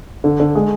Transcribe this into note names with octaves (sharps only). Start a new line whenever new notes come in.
D3
D3
G#3